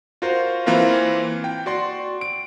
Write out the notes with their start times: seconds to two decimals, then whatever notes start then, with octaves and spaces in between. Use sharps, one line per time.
0.22 F4 F#4 A#4 C5
0.66 E3 A#3 C4 F4 A#4 B4
1.44 G5
1.66 F#4 D5 C6
2.21 D7